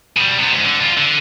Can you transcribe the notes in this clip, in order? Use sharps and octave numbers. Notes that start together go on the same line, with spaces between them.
B2 G3
C3 B3
G#2
D3
G2 F4
D3